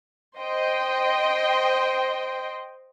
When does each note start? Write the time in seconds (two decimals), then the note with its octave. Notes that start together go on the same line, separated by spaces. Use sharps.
0.39 C5 D#5 G5 C6